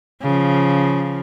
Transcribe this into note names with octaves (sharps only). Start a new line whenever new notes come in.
C#3 F3